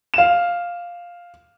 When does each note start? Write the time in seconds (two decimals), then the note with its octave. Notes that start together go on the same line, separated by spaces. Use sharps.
0.14 F5 E7